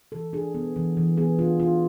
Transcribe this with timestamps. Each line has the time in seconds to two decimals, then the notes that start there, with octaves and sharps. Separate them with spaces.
0.12 E3 A4
0.33 D4 G#4
0.55 B3
0.76 E3
0.97 E3
1.17 B3 G#4
1.39 D4 F4
1.60 D4 F4